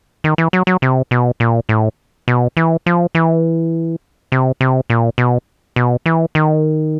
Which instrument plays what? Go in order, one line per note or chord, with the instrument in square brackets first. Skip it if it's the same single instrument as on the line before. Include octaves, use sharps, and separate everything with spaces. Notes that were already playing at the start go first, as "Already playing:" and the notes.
[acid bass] D#3
E3
F#3
F#3
C3
B2
A#2
A2
B2
E3
F3
E3
C3
C3
A#2
B2
B2
E3
D#3